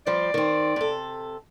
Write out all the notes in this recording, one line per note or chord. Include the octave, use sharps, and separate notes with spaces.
F3 G3 C4 D5
D#3 C4
C3 A4